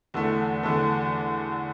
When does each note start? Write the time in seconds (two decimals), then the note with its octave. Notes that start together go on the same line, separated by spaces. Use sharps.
0.14 E2 D3 A3
0.63 E2 D3 A3